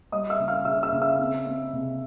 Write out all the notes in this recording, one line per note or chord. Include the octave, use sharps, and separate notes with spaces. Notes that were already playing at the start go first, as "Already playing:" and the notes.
G3 D#5 D#6
E5 E6
C#3
F5 F6
C#3 E5 E6
E5 E6
C#3
E5 E6
C4
C4
C3